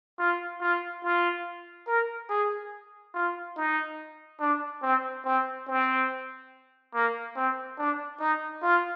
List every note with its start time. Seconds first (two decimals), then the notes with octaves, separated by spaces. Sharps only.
0.19 F4
0.61 F4
1.03 F4
1.87 A#4
2.30 G#4
3.14 F4
3.56 D#4
4.40 D4
4.82 C4
5.25 C4
5.67 C4
6.94 A#3
7.36 C4
7.78 D4
8.20 D#4
8.63 F4